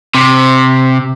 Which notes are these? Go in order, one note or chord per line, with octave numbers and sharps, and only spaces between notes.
C3